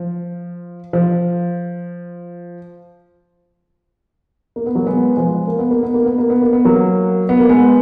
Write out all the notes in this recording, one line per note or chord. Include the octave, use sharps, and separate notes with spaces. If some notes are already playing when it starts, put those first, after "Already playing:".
Already playing: F3
F3
A#3
B3
F#3 A#3
G#3 B3
F3 G#3
A#3
B3
A#3
B3
A#3
B3
A#3
B3
A#3
B3
F#3 A#3
B3
A#3
G#3 B3